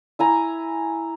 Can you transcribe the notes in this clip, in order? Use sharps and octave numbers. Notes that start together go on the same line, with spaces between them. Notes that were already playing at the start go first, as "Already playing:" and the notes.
E4 G#5 A#5